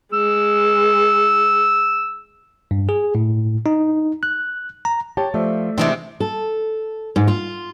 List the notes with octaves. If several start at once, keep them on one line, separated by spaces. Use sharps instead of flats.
G#3 E6
G2
G#4
A2
D#4
F#6
A#5
G4 C#5 A5
F3 A3 D5 E5
C3 E3 G#3 C4 D4
A4
G#2
F4